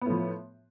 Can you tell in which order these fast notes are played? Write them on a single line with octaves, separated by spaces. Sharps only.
B3 A2 F3